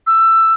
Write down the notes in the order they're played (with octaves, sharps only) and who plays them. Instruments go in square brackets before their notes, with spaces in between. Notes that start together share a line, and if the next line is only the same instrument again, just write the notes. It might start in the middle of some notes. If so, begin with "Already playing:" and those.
[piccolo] E6